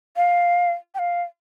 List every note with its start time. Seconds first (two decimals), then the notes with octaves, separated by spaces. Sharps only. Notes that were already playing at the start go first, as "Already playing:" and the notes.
0.16 F5
0.95 G5
0.99 F5